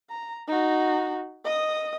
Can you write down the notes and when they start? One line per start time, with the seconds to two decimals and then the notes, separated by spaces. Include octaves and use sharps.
0.10 A#5
0.48 D#4 F#4
1.45 D#5 D#6